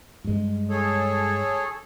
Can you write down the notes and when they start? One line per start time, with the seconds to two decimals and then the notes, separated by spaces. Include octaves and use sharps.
0.24 G2 G#3
0.70 G#4 A4 C#5